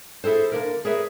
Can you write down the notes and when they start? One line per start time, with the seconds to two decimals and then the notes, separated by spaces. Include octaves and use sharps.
0.24 E4 G#4 A4 C5
0.52 D3 A#3 A#4
0.85 G#4 A#4 B4 C#5 E5